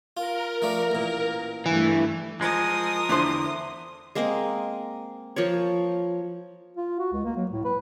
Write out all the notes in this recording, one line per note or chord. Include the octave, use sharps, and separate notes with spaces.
F4 A#4
F3 A3 D4
A1 A#2
G2 E3 A3
F3 G#3 A#4 D#6
E2 D3 D4 E4 C5
G#3 A#3 C4 D#5
F3 A#4 C#5
F4
F#4
C#2
A#3
F#3
A2
B4